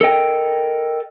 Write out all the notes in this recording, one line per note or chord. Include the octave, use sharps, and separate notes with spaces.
A4 A#4 D#5 G5